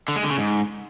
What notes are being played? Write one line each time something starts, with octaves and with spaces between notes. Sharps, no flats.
D3
G#3
D3
C#3
G#2